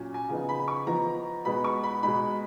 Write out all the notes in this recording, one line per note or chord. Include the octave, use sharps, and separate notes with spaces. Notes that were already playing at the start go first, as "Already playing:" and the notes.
Already playing: A#2 F#3 C#4
G#5
C#3 F3 B3 D#4
B5
C#6
F3 B3 D#4 A#5
B2 G#3 B3 D#4 B5
C#6
B5
B2 G#3 D#4 B5